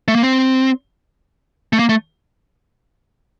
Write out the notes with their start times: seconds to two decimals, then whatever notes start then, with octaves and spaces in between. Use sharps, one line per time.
0.08 A3
0.15 A#3
0.23 C4
1.73 A3
1.79 A#3
1.89 A3